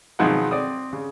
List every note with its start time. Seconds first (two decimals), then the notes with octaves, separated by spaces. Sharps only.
0.19 B1 D#3 F3 G#3 F#5
0.51 C4 D5 D#6
0.93 C#3